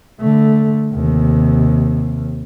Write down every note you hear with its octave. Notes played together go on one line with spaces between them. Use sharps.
D3 A3
D#2 C3